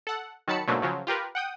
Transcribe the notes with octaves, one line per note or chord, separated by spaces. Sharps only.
A4 F#5
D#3 F#3 A5 B5 C#7
G#2 B2 D3 F#3 A3 A#3
C#3 F3 F#3
F4 G4 A#4 B4
F#5 G5 D#6